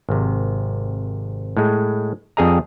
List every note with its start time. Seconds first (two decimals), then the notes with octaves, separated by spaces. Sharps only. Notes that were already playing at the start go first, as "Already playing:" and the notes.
0.09 G#1 C3
1.57 A2 G#3
2.37 F2 G3 G#4 D#5 A#5